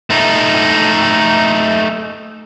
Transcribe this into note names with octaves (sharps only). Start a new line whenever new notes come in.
A3 D#4